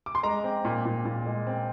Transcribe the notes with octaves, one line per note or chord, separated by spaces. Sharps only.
D6
C6
G#3 A#5
C4
A#2
A#2
A#2
G#3
C4